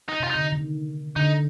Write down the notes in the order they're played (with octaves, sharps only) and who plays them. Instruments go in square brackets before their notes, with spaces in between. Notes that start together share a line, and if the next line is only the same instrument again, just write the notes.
[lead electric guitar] D#4
[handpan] C3 [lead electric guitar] F4
[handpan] D3 [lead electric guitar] D#4
[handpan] D#3
[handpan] D3 [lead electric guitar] D#4